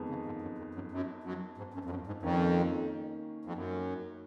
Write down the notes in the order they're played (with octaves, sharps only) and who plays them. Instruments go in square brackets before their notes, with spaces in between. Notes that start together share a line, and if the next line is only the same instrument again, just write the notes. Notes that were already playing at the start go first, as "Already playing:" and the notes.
Already playing: [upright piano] F2 D#3 G#3 B3 D#4
[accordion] C#3
G#2
F#2
F2
F#2
F#2
F#2
G#2
F#2
F2
F#2
G#2
[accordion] F2 [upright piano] D#3 A#3 C#4
[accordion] F2
F#2